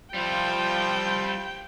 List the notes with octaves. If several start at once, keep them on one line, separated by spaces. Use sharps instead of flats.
F3 G3 E4 F4 G5